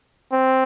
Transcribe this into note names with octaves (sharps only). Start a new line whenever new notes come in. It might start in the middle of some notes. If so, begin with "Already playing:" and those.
C4